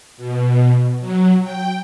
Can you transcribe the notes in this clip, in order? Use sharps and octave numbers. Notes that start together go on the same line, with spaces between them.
B2
F#3
G5